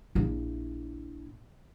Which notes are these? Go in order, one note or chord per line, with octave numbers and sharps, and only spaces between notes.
A#1 E4